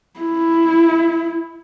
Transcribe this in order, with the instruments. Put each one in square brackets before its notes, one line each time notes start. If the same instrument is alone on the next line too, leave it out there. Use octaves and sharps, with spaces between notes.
[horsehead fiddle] E4